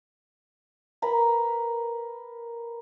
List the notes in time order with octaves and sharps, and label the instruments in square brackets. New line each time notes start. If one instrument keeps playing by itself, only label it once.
[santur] A#4 B4 A#5 B5